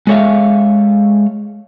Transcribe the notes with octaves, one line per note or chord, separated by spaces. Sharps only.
G#3 A4 C#5 E5 F5